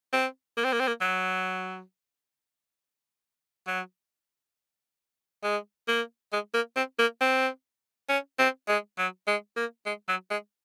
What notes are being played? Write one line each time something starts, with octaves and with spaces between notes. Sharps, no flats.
C4
A#3
C4
A#3
C4
A#3
F#3
F#3
G#3
A#3
G#3
A#3
C4
A#3
C4
C#4
C4
G#3
F#3
G#3
A#3
G#3
F#3
G#3